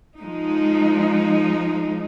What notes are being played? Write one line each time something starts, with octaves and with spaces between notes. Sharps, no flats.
F3 G#3 D#4